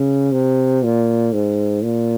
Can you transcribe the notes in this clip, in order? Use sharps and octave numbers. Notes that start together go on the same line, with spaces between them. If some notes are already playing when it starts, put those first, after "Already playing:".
Already playing: C#3
C3
A#2
G#2
A#2